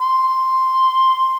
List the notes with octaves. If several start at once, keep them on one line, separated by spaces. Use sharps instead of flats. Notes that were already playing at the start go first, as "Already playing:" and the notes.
C6